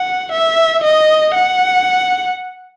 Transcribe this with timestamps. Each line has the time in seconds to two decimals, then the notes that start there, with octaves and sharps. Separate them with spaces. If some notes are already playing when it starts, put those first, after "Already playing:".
Already playing: F#5
0.32 E5
0.84 D#5
1.35 F#5